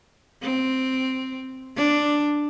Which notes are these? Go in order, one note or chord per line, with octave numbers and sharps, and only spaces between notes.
C4
D4